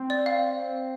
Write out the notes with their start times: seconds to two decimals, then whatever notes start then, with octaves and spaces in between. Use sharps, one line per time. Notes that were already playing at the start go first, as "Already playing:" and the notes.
Already playing: C4
0.10 D5
0.26 F5